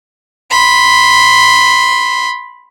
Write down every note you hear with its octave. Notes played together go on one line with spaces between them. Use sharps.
B5 C6